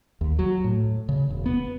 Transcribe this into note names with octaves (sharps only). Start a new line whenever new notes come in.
D#2
F#3
A2
C#3
E1
B3